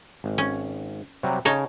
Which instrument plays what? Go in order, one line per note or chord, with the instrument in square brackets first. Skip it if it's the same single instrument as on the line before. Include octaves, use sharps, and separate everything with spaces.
[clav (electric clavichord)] G#1
[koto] C#4
[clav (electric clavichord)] C3 F#3 G3
[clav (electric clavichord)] C#3 [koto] D#4 C#5 A5